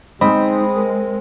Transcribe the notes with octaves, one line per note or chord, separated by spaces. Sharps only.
G#3 C4 D#4 D#5 B5 D#6
A#4